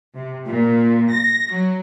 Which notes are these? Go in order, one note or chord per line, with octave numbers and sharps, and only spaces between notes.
C3
A#2
A#6
F#3